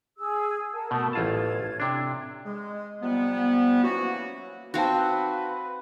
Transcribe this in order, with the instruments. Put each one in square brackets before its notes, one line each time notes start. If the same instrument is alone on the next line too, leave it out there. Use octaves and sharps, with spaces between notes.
[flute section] G#4 E6
A#4 F#5 A5
[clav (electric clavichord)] B2 A3 [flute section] A5 D#6 E6
[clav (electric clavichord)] A1 F4 A5 [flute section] G#6
[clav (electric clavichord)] C3 D4
[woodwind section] G#3
C3 F3 G3 B3
E3 F#3 A#3 C#4 F#4
[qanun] C4 F#4 [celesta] D#4 F5 A5 [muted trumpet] B4